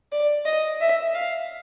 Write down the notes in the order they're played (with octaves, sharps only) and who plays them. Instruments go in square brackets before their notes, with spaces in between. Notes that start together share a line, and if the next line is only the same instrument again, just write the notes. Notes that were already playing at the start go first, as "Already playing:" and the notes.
[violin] D5
D#5
E5
F5